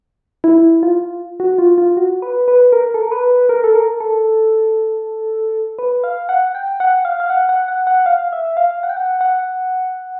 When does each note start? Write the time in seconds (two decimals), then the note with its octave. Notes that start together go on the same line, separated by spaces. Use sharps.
0.44 E4
0.83 F4
1.40 F#4
1.58 F4
1.78 F4
1.97 F#4
2.22 B4
2.48 B4
2.73 A#4
2.94 A4
3.02 A#4
3.12 B4
3.49 A#4
3.64 A4
3.75 A#4
4.00 A4
5.79 B4
6.04 F5
6.29 F#5
6.55 G5
6.80 F#5
7.05 F5
7.20 F5
7.30 F#5
7.49 F#5
7.68 F#5
7.87 F#5
8.06 F5
8.33 E5
8.57 F5
8.83 F#5
8.89 G5
8.97 F#5
9.21 F#5